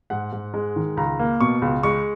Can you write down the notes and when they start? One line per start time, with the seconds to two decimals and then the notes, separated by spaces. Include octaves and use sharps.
0.10 G#2 F#5
0.32 G#2
0.54 G#3
0.76 D#3
0.97 C#2 A#5
1.19 A#3
1.40 B2 C#6
1.62 C#2
1.83 G#3 C#6